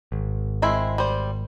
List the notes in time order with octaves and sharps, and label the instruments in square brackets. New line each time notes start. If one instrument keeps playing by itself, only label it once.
[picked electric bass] G#1
[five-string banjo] G#3 C4 E4
G3 C5